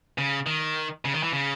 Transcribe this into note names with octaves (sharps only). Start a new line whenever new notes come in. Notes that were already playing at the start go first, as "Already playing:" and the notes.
C#3
D#3
C#3
D#3
E3
C#3